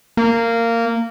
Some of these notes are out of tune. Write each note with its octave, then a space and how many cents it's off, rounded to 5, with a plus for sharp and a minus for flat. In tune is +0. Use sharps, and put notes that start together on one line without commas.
A#3 -15